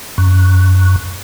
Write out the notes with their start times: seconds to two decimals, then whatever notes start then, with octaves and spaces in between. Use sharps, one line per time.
0.18 F#2